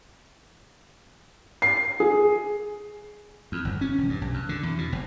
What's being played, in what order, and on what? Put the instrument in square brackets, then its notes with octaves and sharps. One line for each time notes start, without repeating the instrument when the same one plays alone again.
[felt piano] C7
[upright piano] G#4
[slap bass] E2
G1
C#4
E1
G2
B1
F#2
D3
E2
B2
F#1